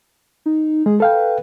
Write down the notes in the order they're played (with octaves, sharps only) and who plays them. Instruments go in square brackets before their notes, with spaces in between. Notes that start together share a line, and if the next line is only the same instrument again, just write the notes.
[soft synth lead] D#4
[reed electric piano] G#3 [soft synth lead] G#4
[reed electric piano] A4 F5 G5 [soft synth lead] B4